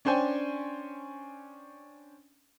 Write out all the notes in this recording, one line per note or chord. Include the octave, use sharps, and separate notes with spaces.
C#4 D4 C5 G5 G#5